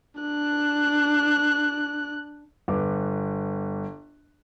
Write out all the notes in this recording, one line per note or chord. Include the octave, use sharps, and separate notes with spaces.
D4 F#6
G1 B4 D6